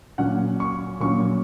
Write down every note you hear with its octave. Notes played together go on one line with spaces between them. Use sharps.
A#2 F#3 C#4 F#5
C#6
A#2 F#3 C#4 C#6